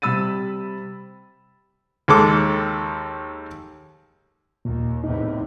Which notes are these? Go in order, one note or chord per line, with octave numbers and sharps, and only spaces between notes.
C3 G3 B5 E6 A6 D#7
D#2 G#3 A4 D6
D#2 A#2
E2 A2 C3 D#4